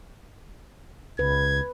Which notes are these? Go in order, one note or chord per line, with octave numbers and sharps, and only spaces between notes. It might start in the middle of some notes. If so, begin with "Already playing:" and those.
C#2 B4 G#6